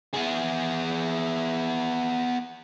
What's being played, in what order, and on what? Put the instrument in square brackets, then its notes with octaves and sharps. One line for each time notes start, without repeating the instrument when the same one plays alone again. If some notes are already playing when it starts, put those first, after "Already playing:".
[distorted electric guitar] B3 G#4